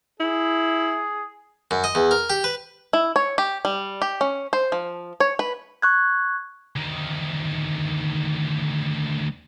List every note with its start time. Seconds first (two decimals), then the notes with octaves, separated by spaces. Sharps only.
0.20 E4 G#4
1.71 F#2
1.84 D#5
1.95 E2
2.11 A#4
2.30 G4
2.44 B4
2.93 E4
3.16 C#5
3.38 G4
3.65 G3
4.02 G4
4.21 C#4
4.53 C5
4.72 F3
5.20 C#5
5.39 B4
5.82 C#6 F#6 G#6
6.76 D2 D#3